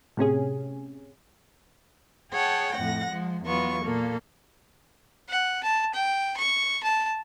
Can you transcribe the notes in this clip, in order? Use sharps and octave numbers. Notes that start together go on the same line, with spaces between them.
A2 C3 C#4 G#4
G#4 C#5 F#5 G5 A5
F2 A2 F#5 A#6
F3 G#3
E2 F#3 B3 F4 C#6
A#2 A#3 A4
F#5
A5
G5
C#6
A5